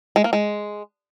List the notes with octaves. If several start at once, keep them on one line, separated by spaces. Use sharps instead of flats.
G#3
A#3
G#3